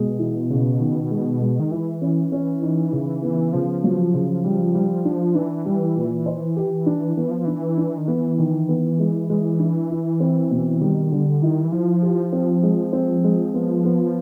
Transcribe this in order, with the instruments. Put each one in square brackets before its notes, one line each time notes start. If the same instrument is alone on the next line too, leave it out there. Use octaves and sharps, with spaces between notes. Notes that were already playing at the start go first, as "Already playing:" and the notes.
Already playing: [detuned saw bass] B2 [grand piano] G#3
[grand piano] E3
C#3
D#3
G#3
G#3
[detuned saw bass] D#3
[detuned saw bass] E3 [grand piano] E4
[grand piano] C#4
C#4
D#4
C#3
B3
[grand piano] C#3 [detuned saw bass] F3
[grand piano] F#3
C#3
G3
G3
D4
[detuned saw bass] E3 [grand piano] D4
[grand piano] G3
A#2
C5
G4
D4
[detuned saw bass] E3 [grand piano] B3
[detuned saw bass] F3
[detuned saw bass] E3 [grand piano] D4
[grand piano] D4
[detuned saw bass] D#3
[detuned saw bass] E3 [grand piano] B3
[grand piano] D#3
B3
G#3
G#3
D4
E4
C4
B2
[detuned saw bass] D#3 [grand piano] G3
[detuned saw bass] D3 [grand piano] G3
[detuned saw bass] D#3 [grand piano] E4
[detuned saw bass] E3
[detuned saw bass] F3 [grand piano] E4
[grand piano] G4
C4
G#3
C4
G#3
[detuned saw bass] F3 [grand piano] B3
[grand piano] B3